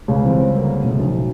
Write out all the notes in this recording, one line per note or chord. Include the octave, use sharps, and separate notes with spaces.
C#2 C#3
E3 G3 C4
D3 F#3 A#3
C#2 A2 C#3 F3 A3
B1 B2